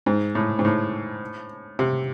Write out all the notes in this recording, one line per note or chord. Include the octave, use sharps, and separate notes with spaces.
G#2
A2
G#2
A2
C3